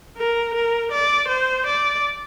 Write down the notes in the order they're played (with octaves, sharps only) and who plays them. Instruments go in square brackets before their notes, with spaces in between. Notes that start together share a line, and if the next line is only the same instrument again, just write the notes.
[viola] A#4
A#4
D5
C5
D5